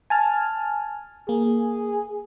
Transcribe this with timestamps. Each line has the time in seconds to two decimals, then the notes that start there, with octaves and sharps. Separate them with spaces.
0.10 G#5 A5 F6
1.29 A#3 G#4